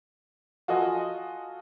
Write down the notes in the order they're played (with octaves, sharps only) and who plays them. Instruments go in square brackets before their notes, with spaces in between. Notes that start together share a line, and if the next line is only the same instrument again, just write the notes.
[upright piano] F4 F#4 A4 D#5 G#5 C6